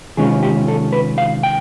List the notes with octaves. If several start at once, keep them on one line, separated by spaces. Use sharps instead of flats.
C3 D#3 G#3 C#4 F4 G#4
G4
A4
B4
F5
G5